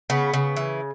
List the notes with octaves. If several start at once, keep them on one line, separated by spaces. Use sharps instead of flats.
C#3 B3
C#3
E3